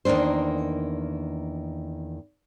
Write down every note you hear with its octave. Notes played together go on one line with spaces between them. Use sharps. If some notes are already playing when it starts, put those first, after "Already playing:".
E2 D#3 A#3 D4 C5